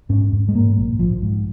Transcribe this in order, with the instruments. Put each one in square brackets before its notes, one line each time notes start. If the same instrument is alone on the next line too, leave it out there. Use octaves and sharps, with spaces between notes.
[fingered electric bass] G#2 C#4
G#2
G#3
G#2 A#3
A#1
A#1 F3
G#2